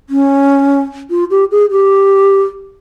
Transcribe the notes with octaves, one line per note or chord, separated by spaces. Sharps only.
C#4
F4
G4
G#4
G4